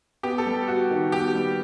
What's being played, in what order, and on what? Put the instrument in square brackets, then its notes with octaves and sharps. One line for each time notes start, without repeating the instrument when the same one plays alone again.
[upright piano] B3 [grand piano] G4
[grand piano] A4
[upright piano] G3
F#4
D#3
[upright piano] B3 [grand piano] G4
[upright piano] G3